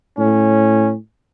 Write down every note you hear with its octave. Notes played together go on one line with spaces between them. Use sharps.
A2 C#4